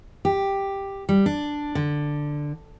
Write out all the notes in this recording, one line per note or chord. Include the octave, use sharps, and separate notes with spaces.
G4
G3
D4
D3